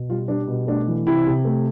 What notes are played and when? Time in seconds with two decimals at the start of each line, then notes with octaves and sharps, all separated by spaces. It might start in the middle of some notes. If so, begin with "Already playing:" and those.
Already playing: B2
0.09 G3 F4
0.28 G3 D4
0.48 B2
0.67 A3 D4
0.88 E3
1.07 C3 E4
1.26 C3
1.45 A3